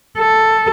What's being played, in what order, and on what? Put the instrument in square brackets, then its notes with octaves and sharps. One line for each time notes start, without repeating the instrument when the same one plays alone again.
[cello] A4